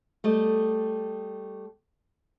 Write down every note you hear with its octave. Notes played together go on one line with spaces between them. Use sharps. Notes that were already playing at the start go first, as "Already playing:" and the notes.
G3 A3 D#5